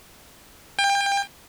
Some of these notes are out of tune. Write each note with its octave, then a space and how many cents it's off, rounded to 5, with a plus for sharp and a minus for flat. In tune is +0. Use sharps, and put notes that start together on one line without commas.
G5 +30